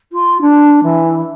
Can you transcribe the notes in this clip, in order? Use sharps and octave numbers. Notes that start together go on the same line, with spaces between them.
F4
D4
E3